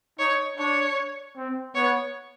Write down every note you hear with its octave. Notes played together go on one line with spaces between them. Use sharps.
D#4 C#5
D4 C#5
C4
B3 C#5